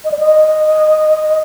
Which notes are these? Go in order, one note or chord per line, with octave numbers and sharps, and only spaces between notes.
D#5
D5
D#5